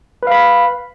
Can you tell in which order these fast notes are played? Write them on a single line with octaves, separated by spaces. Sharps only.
B4 F5 B5